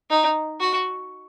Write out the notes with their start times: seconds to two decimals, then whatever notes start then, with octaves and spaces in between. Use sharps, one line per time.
0.10 D#4
0.60 F#4